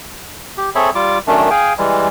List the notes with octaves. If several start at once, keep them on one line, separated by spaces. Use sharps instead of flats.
G4
C4 G#4 A4 C#5 E5 B5
G3 F4 D6
F#2 D#3 A3 C#4 D4
G#4 F5 G5 G#5
E3 G3 G#3